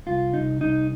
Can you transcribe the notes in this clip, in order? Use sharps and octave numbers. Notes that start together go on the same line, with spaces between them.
C2 F4
C2 D#4
C2 D#4